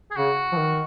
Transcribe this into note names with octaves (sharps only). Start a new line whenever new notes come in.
G#4
C#3 F#4
F3
D#3